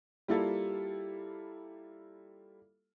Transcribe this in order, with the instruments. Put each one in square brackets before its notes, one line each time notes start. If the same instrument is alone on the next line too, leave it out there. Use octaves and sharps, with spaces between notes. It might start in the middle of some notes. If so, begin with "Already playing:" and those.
[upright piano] G3 A#3 E4 F4 A4